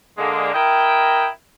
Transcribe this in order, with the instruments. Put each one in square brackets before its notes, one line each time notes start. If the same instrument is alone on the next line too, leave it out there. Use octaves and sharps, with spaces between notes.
[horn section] D3 G#3 A#3
E4 A#4 D#5 G5